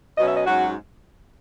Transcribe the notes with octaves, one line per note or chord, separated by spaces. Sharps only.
B2 F#3 C#4 D#5
E5
D#5
G#2 F#3 C#4 F#4